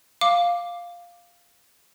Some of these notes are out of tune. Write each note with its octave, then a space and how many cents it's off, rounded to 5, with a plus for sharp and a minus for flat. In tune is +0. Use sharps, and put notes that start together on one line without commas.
F5 +0 D6 +0